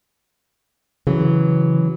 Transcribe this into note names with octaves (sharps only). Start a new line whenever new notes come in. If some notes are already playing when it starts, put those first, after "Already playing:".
C#3 E3 F#3